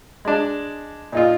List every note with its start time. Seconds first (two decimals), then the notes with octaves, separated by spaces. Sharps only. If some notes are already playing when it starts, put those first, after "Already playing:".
0.25 G#3 D4
1.12 A#2 D#4 F4